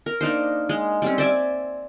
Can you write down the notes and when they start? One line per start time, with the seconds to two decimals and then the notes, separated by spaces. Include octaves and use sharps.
0.06 A#4
0.21 A#3 D4 D#4 C5
0.69 G#3
1.02 G3 C4 C#4
1.18 C5 D5 E5 G#5